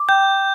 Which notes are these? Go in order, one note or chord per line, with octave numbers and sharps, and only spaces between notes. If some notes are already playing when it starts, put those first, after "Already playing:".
Already playing: D6
G5 G6